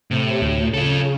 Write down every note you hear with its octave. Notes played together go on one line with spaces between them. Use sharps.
A2 C3
D2
C#3 F4 A4